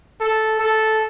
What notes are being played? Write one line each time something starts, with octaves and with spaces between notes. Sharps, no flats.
A4
A4